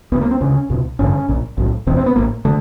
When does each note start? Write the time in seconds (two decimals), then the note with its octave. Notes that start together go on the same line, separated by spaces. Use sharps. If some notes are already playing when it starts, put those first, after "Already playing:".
0.12 C#2 B3
0.15 C#3
0.21 A#3
0.31 C4
0.41 D2 C#3 C#4
0.70 C#2 B2
0.99 A1 G2 D3 C#4
1.28 A#1 A#2
1.57 B1 A2
1.87 F1 E2 B2 C4
1.97 C4
2.06 B3
2.16 A1 A2 A#3
2.45 D3 A3